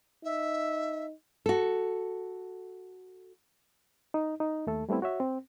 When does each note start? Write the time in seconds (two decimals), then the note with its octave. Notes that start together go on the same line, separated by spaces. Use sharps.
0.24 D#4 E5
1.46 F#4 A4
4.14 D#4
4.40 D#4
4.67 D#2 A3 A4
4.89 G3 A3 B3 C4 E4
5.02 F#4 C#5 E5
5.20 C4